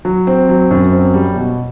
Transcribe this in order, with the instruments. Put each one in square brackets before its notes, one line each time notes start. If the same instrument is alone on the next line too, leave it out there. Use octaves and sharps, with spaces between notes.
[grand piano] F#3
C4
F#3
F#2
C4
G3
B2